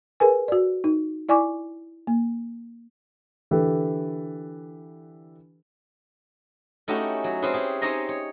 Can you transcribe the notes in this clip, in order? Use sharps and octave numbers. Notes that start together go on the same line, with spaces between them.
G#4 A#4 B4 G#5
F#4 D5
D#4
E4 D5 G#5 C#6 D6
A#3
D3 E3 G4 A4 B4
A3 C#4 D#4 E4 F#4 G4
F#3
C4 C#4 E4 G#4 B4
G4 G#4
C4 D#4 C#5 D#5 A#5
C#5